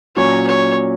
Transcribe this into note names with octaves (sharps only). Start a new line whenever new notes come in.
A#2 F#3 C#4 C#5
C#5